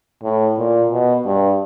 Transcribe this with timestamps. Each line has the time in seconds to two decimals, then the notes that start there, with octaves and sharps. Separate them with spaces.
0.23 A2
0.58 A#2
0.91 B2
1.25 G2